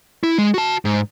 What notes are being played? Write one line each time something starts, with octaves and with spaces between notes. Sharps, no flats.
E4
G#3
F#4 A5
G#2